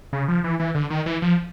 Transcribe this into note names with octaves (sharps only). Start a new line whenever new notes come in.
C#3
F3
E3
E3
D3
D#3
E3
F3